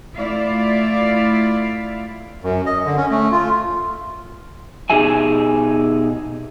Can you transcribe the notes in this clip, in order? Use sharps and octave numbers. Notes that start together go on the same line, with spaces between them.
A3 E4 F4 D5 F5
F#2
D#5
D3
C#4
A3
F4
B2 D#4 G4 G#4 E5 G#5